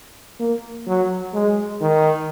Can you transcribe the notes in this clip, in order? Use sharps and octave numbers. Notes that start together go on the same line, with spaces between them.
A#3
F#3
G#3
D#3